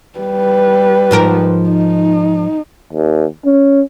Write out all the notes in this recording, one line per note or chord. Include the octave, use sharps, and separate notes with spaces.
G3 B4
G#2 F3 A#4
D#4
D#2
C#4